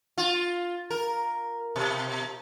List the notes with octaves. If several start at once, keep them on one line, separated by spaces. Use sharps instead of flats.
F4
A#4
B2